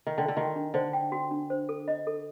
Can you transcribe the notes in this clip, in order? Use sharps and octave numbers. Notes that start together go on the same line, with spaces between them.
D#3
D3 G5
D3
D#3 F#4
D4
D3 C5
G5
F#4
D4
C5
A4
D#5
A4